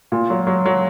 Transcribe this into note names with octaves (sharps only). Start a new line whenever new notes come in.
A#2
F#3
F#3
F#3